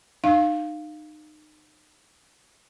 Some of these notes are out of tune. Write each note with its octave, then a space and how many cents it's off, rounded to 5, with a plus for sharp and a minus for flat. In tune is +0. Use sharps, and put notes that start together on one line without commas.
D#4 -30 F5 +0